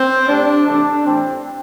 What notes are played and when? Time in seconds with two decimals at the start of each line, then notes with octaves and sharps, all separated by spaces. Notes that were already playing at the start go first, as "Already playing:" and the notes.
Already playing: C4
0.28 A2 G3 D4
0.66 C3 E3 A3 D4
1.05 A2 E3 G3 C4